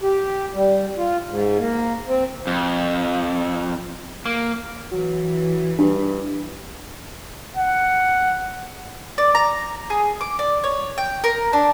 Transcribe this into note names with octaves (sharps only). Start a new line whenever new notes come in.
G4
G3
F4
G#2
A#3
C4
F2
A#3
E3 F#3
G2 D4
F#5
D5
A#5
G#4
D6
D5
C#5
G5
A#4
D4